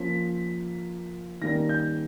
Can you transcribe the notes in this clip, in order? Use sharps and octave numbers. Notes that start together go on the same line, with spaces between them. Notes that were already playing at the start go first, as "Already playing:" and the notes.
Already playing: F3 A#3 C#4 F4 B6
D#3 G3 A#3 C#4 A#6
G6